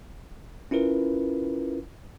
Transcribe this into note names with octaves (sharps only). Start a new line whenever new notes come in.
C#4 E4 F4 A#4 B4